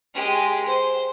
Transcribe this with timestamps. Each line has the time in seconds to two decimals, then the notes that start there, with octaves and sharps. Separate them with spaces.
0.14 G#3 G4
0.66 C5